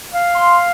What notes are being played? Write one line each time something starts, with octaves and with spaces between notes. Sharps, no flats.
F5
C6